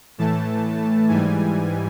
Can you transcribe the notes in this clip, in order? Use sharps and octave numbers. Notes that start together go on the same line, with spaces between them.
A2 E3 A3 A5
G#2 E3 G3 G#5